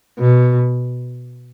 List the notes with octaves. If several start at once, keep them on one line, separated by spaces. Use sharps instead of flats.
B2